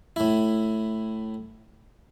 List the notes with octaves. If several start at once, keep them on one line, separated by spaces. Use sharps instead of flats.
A2 E4